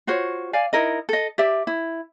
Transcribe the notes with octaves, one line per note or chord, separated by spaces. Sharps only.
F4 F#4 C5 C#5
D5 F5 G#5
D#4 E4 A#4 D#5
A4 D#5
G4 D5 E5
E4